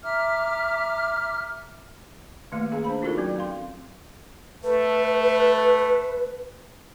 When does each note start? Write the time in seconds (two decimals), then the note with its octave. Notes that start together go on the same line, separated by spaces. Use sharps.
0.03 E5 A#5 D6 F6
2.52 D#3 A3 A#3 G4
2.71 C#4 G#4 F5 A#5
2.84 D4 C5 B5
3.02 D#4 F4 F#4 A4 A#4 D5
3.17 F#3 C4 C#4 F#4
3.36 C4 F5 C6
4.63 A3 B4